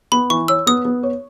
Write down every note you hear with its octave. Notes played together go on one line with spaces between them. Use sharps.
B3 B5
E3 C#6
C#5 E6
B3 D#6
B3
C#5